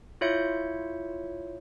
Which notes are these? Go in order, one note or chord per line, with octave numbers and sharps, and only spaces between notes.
E4 F4 C#5 E5 G6 C#7